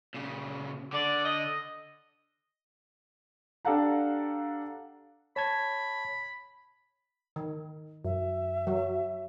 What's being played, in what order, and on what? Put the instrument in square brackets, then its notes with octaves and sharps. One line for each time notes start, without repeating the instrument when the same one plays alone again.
[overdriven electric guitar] A#2 C#3
[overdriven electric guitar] D3 [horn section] D5
[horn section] D#5
[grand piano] D4 G4 A4 F5 F#5 A#5
[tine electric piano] C#5 A5 G#6 [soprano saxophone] B5
[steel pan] D#3
[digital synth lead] F#2 [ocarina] E5
[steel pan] F#3